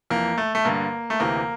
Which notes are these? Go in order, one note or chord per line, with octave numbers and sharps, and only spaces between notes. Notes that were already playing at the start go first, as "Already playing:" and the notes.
F2 E3 A#3
A3
A3
G2 D3 A#3
A3
D2 C3 E3 A#3